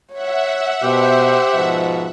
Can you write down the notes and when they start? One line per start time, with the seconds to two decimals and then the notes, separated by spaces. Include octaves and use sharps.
0.13 C#5 E5 F#5
0.83 B2 G4 C5
1.54 G#2 B2 F3